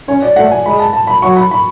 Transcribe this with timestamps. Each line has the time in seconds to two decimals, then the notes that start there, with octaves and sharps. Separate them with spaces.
0.08 C#4 C#5
0.23 D5
0.36 A3 F#5
0.51 G#5
0.65 G#3 B5
0.79 A5
0.93 A5
1.07 B5
1.22 F#3 C#6
1.37 B5
1.51 B5